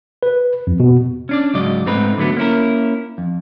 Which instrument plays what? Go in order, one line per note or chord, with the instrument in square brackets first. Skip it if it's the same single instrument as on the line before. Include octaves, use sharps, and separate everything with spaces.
[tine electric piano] B4
F2
B2
[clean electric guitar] C#4 D4 D5
C#2 G#2 F#3 G#3 D5 D#5
G#2 A3 C4 D#4 B4
D3 F#3 A3 B3
A#3 C#4 E4 A#4
F2